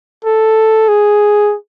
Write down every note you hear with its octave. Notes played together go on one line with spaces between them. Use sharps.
A4
G#4